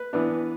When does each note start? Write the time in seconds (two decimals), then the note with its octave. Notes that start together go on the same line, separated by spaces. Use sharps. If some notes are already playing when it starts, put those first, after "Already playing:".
Already playing: B4
0.13 E3 B3 D4